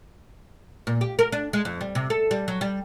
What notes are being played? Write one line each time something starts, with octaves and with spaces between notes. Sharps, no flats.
A#2
G4
A#4
D4
G#3
F2
G3
C3
A4
G3
F#3
G3